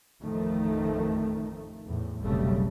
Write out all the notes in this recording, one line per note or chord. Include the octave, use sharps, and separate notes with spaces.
A1 F2 D#3 F3 A3
E2 A2
F1 B1 C#3 G3 A3